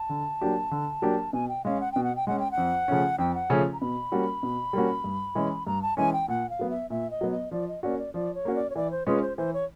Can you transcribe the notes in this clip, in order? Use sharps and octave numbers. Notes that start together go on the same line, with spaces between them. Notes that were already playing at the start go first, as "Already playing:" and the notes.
Already playing: A5
D3
F#3 A#3 D4 G4
D3
F#3 A#3 D4 G4
B2 G#5
G5
G#3 C#4 F5
F#5
B2 G5
F#5
G5
G#3 C#4 F#5
G5
F#5
F2
C#3 F3 A3 C#4
F2 G5
F#5
C#3 F3 A3 C#4
A#5
B2 B5
G3 A#3 C#4 F#4
B2
G3 A#3 C#4 F#4
G2
E3 G#3 C#4
G2 A#5
A5
E3 G#3 C#4 G#5
G5
A#2 F#5
F5
F#3 B3
E5
A#2 E5
D#5
F#3 B3
D#5
F3 D5
D#5
A#3 C#4 F#4 D5
D5
F3 D5
C#5
A#3 C#4 F#4
D5
C#5
E3 D5
C5
G#3 C#4 F4 G#4 B4
C5
E3 C5
C#5